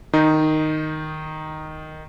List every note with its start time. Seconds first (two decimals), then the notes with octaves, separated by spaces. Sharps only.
0.13 D#3 D#4